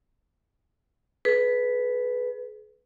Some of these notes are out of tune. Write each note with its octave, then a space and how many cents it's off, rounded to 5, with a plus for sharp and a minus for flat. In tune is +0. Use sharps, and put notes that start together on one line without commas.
G#4 +40 B4 +0